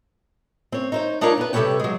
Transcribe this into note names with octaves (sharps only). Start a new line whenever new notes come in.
C4 C#5
D#4 C5 C#5
D4 D#4 F4 A#4 C#5 D5
B3 B4
C3 G3 A4 B4 C#5 G5
F#3 G#3